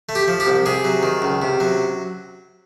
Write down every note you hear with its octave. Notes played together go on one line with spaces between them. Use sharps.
A3
G4
F3
G4
C2
C3 G#4
F#3
D#3
C#2
C3
F#3